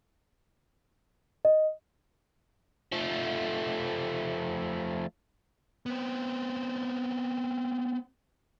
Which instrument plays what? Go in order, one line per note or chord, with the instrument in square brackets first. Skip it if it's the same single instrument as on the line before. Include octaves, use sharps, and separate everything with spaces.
[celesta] D#5
[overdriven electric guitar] F3 A3
[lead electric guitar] B3 C4